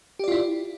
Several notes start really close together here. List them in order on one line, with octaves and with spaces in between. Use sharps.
G4 D5 F4 E4